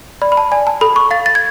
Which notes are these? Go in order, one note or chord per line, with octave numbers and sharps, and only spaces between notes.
D5 B5
B5
A5
D5 G#5
A5
A4 B5
C#6
F5 A6
A6
G#6